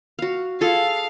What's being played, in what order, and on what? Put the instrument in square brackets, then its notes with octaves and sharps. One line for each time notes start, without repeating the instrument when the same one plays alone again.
[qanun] F#4 F5
[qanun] F4 G#4 A4 [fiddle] F5